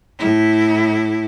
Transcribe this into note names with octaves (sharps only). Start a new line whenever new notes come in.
A2 E4